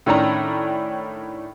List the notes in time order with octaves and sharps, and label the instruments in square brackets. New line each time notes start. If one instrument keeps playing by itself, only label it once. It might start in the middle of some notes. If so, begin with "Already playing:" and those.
[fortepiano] A2 D#3 C#4 D4 A#5